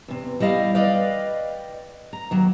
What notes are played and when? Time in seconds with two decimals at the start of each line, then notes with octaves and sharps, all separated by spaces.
0.08 E2 C3
0.40 G3 E4 D#5 F5
0.74 B4 D5 D#5 F5 G5
2.13 A#5
2.31 D#2 F#3